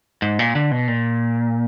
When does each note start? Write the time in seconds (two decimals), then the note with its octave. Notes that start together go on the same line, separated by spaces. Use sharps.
0.22 G#2
0.39 A#2
0.55 D3
0.71 B2
0.88 A#2